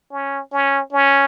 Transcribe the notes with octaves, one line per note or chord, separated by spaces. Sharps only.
C#4
C#4
C#4